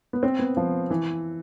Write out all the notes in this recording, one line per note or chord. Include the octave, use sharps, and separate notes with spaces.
B3
C4
B3
F3
E3